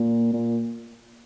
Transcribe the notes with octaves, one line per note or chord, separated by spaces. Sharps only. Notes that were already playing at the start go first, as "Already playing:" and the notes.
Already playing: A#2
A#2